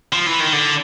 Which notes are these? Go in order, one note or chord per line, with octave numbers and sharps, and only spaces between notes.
F3
E3
D#3
D3